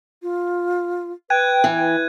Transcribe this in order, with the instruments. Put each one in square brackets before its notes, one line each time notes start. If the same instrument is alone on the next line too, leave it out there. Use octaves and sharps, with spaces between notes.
[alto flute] F4
[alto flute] B4 [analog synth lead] G5 [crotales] F#6 G#6 D#7
[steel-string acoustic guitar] E3